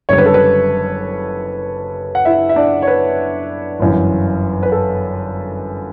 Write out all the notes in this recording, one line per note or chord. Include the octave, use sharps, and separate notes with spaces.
F#1 F#2 D3 G3 C#5
B4
A4
B4
F#5
E4 E5
E5
D4 D5
C#5
B4
G1 F#2 E3
B4
A4